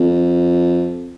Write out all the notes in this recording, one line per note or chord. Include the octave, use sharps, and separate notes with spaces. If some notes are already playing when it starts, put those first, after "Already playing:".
Already playing: F2